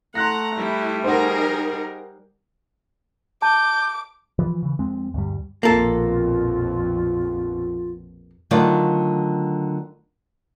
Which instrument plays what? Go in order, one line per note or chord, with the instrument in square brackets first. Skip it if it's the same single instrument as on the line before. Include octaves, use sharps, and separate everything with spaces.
[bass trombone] A3 [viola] F#5 A#5 [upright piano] C6 F#6 A#6
[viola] G3 [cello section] E4
[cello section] D#4 G#4 A#4 [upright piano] C5 F#5
[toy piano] A5 [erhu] D6 [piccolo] G6
[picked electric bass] E3 F3
C#3 E3
F2 G#3 C4
D2 G2 G3
[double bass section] A#1 F2 B2 [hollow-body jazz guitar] A#3 A4 [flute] F4
[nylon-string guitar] D3 D#3 F#3 A3 F4 D5